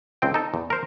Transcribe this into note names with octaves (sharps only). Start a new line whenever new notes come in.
C#2 C4 G5
D#4 A4
E2
A#4 C5